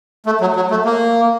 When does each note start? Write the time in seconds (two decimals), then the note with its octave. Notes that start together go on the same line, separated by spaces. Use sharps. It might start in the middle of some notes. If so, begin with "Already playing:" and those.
0.26 A3
0.41 F#3
0.56 F#3
0.71 A3
0.85 A#3